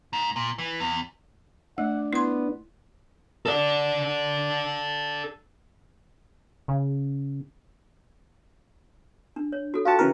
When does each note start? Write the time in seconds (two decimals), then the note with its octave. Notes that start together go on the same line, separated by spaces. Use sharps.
0.13 G#2
0.36 A#2
0.58 E3
0.80 E2
1.78 A3 D4 F#5
2.13 B3 E4 C6
3.46 A4 D5
6.68 C#3
9.36 D4
9.52 C#5
9.74 F#4 A4
9.85 F4 F#4 A4 F5 G5 A5
9.99 C#3 E3 A#4